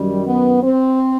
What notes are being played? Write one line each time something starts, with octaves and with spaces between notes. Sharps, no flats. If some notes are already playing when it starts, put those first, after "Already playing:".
Already playing: F#2 D#3 G3
B3
C4